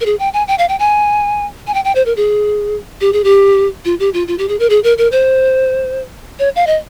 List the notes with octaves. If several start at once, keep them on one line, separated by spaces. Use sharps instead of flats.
A#4
G#4
G5
G#5
G5
F5
G5
G#5
G#5
G5
G5
C5
A#4
G#4
G4
G#4
G4
F4
G4
F4
F4
G4
G#4
A#4
G#4
A#4
A#4
C5
C#5
F5
D#5